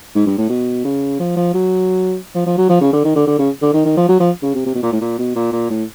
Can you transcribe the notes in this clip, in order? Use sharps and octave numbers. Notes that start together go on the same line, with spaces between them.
G#2
G2
A2
B2
C#3
F3
F3
F#3
F3
F3
F#3
F3
C#3
D3
D#3
D3
D3
C#3
D3
D#3
D#3
F3
F#3
F3
C#3
C3
C3
B2
A#2
A2
A#2
B2
A#2
A#2
A2